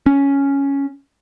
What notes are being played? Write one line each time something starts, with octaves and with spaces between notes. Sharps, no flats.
C#4